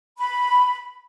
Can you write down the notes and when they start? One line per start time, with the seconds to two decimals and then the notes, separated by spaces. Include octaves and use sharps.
0.18 B5